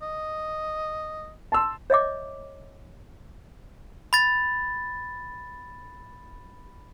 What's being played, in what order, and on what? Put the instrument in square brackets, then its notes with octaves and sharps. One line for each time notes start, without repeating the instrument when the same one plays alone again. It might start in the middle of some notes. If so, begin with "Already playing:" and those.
[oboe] D#5
[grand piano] A5 C6 E6
[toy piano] C#5 D#5 E5 D6
[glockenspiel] B5 A6